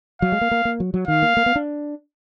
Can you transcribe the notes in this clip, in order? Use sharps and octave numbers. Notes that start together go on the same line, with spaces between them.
F#3 F5
G#3
A#3
A#3
A#3
F#3
F#3
D#3 F5
A#3
A#3
B3
D4